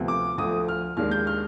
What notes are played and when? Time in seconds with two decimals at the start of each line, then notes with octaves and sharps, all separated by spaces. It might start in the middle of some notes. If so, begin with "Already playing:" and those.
Already playing: D2 C3 F3 B3
0.08 D6
0.38 D2 D3 F3 D#6
0.68 F6
0.97 D#2 D#3 G#3 D4 F6
1.11 G6
1.27 F6